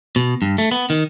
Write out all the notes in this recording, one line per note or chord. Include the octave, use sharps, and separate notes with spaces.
B2
G2
A3
B3
D#3